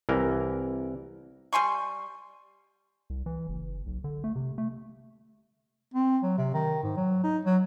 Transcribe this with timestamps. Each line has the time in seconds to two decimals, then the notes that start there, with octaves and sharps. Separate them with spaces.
0.09 C2 E3 A#4
1.53 G3 G#5 C6 C#6
3.10 C2
3.26 E3
3.49 F#1
3.86 B1
4.04 D3
4.24 A3
4.36 C3
4.58 A3
5.94 C4
6.23 F#3
6.38 C3
6.54 D#3
6.83 G#2
6.97 F#3
7.24 D#4
7.45 F#3